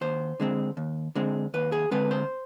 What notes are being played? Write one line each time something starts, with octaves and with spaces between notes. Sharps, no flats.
D#2 C5
D3 G#3 C4
D#2
D3 G#3 C4
D#2 B4
G#4
D3 G#3 C4 B4
C5